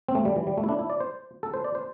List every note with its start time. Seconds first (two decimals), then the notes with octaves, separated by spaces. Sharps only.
0.08 C4
0.15 A3
0.25 G3
0.36 E3
0.47 G3
0.58 A3
0.64 E4
0.69 D4
0.79 E4
0.90 D5
1.00 C5
1.43 A4
1.54 C5
1.64 D5
1.75 C5